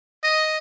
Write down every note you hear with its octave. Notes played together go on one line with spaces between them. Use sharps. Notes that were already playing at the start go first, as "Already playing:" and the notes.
D#5